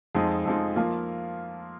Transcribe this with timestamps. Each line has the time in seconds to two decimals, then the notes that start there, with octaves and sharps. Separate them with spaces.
0.15 F2 F3 G#3 D#4
0.45 F2 F3 G#3 D#4
0.76 F3 A#3 F4